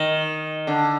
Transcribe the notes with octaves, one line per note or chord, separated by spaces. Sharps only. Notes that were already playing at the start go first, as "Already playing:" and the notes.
Already playing: D#3
D3